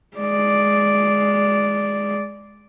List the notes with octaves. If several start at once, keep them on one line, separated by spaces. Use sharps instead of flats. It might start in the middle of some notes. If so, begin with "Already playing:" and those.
G#3 D5